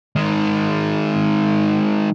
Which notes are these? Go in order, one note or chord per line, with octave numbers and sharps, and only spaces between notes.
D#3 G#3